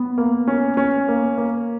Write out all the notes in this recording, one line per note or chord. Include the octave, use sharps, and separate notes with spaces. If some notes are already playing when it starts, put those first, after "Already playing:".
Already playing: B3
A#3
C#4
C#4
A#3
A#3